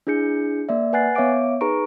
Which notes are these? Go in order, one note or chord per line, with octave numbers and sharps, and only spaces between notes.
D4 E4 G#4 G6 C#7
A#3 D5 E5
B4 F#5 G#5 F#6 A6 C7
B3 C#5 E5 F5 D6 D7
D#4 G#4 B4 A#5 C#6 D7